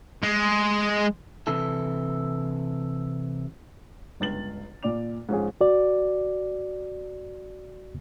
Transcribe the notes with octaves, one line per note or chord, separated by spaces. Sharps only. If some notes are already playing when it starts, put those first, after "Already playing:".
G#3
C3 E3 E4 A4
G1 C#2 A6 F#7
A#2 D5 D6 F7
G#2 F3 C#4 G#4
F#4 D5